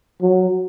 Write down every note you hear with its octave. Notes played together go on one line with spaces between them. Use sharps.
F#3